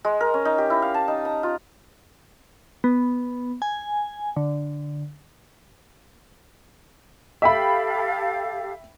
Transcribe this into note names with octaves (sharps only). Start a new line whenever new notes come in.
G#3
A#4
C#4
D#4
G4
E4
F5
A5
D#4
A#5
F4
B3
G#5
D3
G4 A4 E5 F5 G5 B5